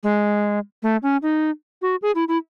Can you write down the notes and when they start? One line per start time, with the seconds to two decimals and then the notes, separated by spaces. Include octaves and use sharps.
0.03 G#3
0.83 A3
1.03 C#4
1.22 D#4
1.82 F#4
2.02 G#4
2.15 E4
2.28 E4